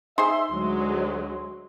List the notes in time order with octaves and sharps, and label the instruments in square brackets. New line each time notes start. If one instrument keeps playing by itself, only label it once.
[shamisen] D#4 G#4 C5 [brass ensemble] E5 [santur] C6
[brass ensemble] D2 [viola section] F#3 G#3